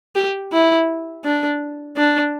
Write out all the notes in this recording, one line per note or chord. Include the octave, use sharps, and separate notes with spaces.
G4
E4
D4
D4